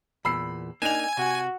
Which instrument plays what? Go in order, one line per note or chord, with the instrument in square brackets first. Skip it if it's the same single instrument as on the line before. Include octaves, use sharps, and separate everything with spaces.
[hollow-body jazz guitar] E2 A#2 [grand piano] B5 E6 C7
[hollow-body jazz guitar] A#3 D4 D#4 [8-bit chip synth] G#5 [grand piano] E7 F7
[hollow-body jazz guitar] C3 [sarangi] F#4